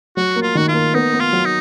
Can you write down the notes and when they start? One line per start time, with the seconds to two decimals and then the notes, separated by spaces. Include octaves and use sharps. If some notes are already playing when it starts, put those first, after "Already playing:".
0.16 F#3 F#4
0.36 A#3
0.42 F4
0.55 D#3 F#4
0.68 F4
0.74 A#3
0.94 B3 D#4
1.13 B3
1.20 F4
1.33 F#3
1.45 D#4